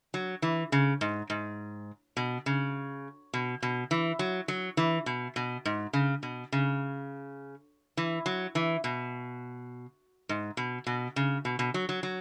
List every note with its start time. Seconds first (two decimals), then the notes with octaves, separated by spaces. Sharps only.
0.14 F#3
0.42 E3
0.72 C#3
1.01 G#2
1.30 G#2
2.17 B2
2.46 C#3
3.34 B2
3.63 B2
3.91 E3
4.19 F#3
4.48 F#3
4.77 E3
5.06 B2
5.36 B2
5.65 G#2
5.93 C#3
6.23 B2
6.52 C#3
7.97 E3
8.26 F#3
8.55 E3
8.84 B2
10.29 G#2
10.57 B2
10.87 B2
11.16 C#3
11.45 B2
11.59 B2
11.74 F#3
11.89 F#3
12.03 F#3